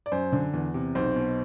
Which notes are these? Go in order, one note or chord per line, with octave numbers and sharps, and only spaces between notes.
D5
F#2 C5
D3
E2
C3
B1 C5
B2